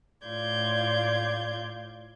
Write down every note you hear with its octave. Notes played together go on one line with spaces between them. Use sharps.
A2 F4 D5 G6 G#6